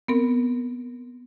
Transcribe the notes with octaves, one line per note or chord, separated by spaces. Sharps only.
B3 C4 A#4